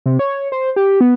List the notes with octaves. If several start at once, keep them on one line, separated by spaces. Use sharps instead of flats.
C3
C#5
C5
G4
B3